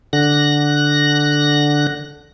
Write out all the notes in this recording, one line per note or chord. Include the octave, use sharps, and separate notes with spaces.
D3 F#6 A#6